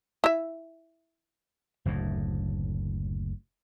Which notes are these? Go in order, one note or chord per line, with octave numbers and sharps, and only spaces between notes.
E4 E5
F#1 D2 A2